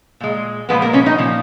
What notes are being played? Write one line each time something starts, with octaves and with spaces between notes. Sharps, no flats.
A#2 G#3
A#2 F3 G#3 B3 B4
A#3 A#4
C#4 C#5
D#4 D#5
A#2 F3